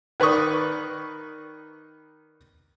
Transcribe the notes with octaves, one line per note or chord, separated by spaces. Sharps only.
D#3 B4 D5 C#6 D#6